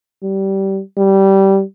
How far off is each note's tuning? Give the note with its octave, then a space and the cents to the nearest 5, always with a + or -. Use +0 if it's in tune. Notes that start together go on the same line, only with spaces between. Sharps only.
G3 -20
G3 -15